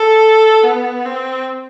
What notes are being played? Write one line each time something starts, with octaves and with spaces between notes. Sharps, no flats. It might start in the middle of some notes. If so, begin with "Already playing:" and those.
Already playing: A4
B3
C4